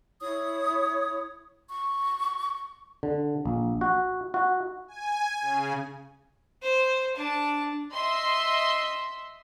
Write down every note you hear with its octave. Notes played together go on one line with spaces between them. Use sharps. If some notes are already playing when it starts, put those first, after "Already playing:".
E4 C#5 D#6
C#6
D3
A#1
F#4
F#4
G#5
C#3
C5
D4 A5
D#5 E5 C6